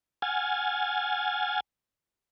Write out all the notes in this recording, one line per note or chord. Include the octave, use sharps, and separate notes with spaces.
F#5 G#5 F6 G#6 A6